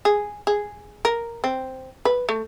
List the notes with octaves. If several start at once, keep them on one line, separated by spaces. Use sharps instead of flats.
G#4
G#4
A#4
C4
B4
A3